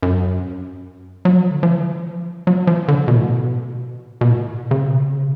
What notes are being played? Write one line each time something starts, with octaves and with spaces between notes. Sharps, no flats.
F#2
F#3
F3
D3
F3
F#3
F3
D3
B2
A2
B2
B2
A2
C#3
B2
C#3